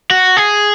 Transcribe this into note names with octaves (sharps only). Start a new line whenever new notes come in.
F#4
G#4